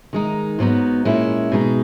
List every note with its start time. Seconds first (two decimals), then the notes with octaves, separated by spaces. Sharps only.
0.13 D#3 G#3 D#4
0.59 G#2 F#3 B3 D#4
1.05 A#2 G#3 C#4 E4
1.52 B2 G#3 D#4